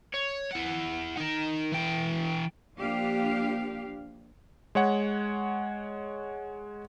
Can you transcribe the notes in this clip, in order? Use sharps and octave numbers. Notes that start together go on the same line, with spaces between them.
C#5
E4 F#5
D#4 A#4
E3 G5
F3 A#3 D4 G4 F5
G#3 C#5 F#5